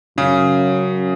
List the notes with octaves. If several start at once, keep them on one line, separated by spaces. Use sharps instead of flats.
F#2 C#3